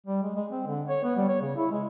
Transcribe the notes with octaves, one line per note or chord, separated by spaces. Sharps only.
G3
G#3
G#3
C4
D3
C#5
B3
G3
C#5
C#3
E4
G#3